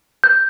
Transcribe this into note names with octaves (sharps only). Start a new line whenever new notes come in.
G6